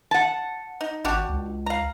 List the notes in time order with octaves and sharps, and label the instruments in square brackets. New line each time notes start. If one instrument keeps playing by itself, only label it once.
[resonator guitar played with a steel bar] F#5 A5
[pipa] D#4
[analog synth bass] G#1 [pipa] D4 F#4 G4
[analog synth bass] C#2
[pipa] F5 A#5